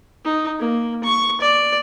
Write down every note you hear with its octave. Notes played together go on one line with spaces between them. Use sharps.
D#4
A#3
C#6
D5